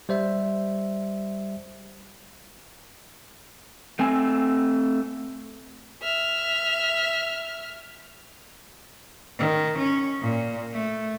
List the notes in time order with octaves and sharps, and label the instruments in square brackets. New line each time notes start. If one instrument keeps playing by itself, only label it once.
[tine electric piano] G3 C5 E5
[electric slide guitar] A3 C4 G#5
[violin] E5 F6
[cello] D#3
C#4
A#2
A3